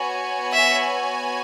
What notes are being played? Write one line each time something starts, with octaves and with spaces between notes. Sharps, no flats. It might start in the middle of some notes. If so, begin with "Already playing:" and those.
Already playing: B3 F#4 C#5 G#5
E5